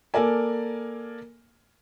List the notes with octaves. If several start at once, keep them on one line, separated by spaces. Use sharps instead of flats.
A#3 A4 A#4 D5 G#5